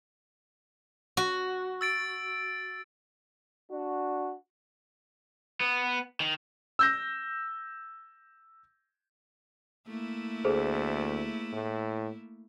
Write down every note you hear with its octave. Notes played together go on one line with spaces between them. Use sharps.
F#4
E6 A6 D7
D4 F#4
B3
D#3
E6 G6 A#6
A3 A#3 E4
D2 G#4 A4 C5
A2